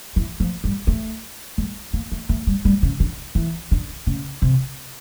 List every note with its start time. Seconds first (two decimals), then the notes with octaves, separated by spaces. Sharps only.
0.16 E3
0.40 F3
0.64 G3
0.87 A3
1.58 G#3
1.93 A#3
2.12 A3
2.29 A3
2.47 G3
2.65 G3
2.83 C#3
3.00 D3
3.35 E3
3.71 D3
4.07 C#3
4.42 C3